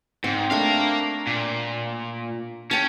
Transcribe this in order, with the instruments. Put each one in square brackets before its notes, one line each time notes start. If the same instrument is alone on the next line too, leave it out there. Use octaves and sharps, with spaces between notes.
[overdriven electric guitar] G#2 [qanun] C4
[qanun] A3 D4 [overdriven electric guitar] A#4 F5
[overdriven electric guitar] A#2
[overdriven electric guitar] C#4 [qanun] G5 A5